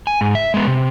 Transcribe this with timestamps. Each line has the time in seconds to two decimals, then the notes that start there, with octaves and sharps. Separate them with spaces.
0.07 G#5
0.21 G#2
0.35 E5
0.54 G#3 B3
0.67 C3